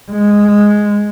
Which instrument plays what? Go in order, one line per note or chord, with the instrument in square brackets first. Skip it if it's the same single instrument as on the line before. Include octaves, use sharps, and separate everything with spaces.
[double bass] G#3